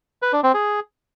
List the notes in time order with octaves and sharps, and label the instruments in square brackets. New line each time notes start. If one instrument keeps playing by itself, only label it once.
[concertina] B4
D4
C4
G#4